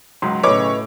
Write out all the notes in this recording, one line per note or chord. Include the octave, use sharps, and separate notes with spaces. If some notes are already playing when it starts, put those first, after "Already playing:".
C#2 G#2 F#3 C6
B1 A2 C#3 B4 C#5 D#5 D6